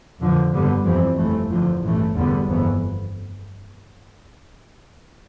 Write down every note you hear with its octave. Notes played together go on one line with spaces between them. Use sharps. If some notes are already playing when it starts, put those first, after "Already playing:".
F2 D3 F3
G2 D3 G3 B3
F2 E3 G3 C4
G1 F2 E3 A3
E2 D3 F3
A1 G2 E3 A3
E2 D3 G3 B3
G1 F2 E3 B3